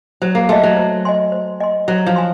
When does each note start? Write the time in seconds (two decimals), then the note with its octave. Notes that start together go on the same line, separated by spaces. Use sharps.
0.22 F#3 C5
0.35 A#3
0.49 A3 D#5 G#5 C6
0.63 F#3
0.77 C5
1.05 D#5 G#5 C6
1.32 C5
1.60 D#5 G#5 C6
1.88 F#3 C5
2.06 F3
2.16 G#5 C6